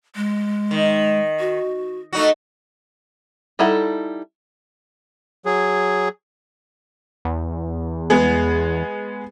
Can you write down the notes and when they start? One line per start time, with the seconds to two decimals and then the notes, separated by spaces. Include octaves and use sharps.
0.16 G#3
0.71 D#3
1.40 F#4
2.13 A3 D#4 F#4
3.59 G3 D#4 E4 A4 F#5
5.45 F#3 G#4
7.25 E2
8.10 G#3 B3 G#4